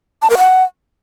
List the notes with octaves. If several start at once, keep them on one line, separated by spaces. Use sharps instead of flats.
A5
A#4
F#5